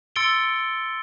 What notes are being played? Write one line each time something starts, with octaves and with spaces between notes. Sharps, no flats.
C6 E6 A6 C#7 D7 G7